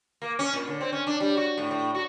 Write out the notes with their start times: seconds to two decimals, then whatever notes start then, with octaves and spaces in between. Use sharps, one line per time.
0.22 A#3
0.39 C#4
0.53 A#2
0.67 D3
0.81 C4
0.92 C#4
1.07 D4
1.20 G3
1.37 F#4
1.58 A2
1.71 A2
1.95 F#4